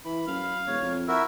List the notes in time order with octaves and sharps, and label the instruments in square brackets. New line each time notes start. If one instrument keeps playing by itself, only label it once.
[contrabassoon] E3 [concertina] B5
[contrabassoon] F#2 [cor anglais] F5
[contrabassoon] E1 [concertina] C#5
[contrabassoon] F2
[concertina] E4 F#4 A#4 [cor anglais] E5